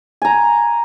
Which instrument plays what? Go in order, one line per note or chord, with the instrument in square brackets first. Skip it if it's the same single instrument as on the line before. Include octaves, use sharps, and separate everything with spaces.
[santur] G#5 A#5